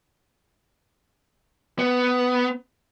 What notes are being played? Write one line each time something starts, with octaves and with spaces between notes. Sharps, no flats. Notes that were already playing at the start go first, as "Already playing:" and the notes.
B3